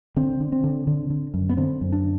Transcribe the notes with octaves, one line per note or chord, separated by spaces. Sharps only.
D3 C4
D3
C4
D3
D3
D3
F#2
B3
D3 C4
F#2
D4